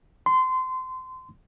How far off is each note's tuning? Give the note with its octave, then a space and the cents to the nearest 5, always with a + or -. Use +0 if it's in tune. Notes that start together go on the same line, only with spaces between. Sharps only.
C6 -25